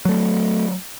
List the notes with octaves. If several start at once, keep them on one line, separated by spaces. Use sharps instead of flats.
F#3 A3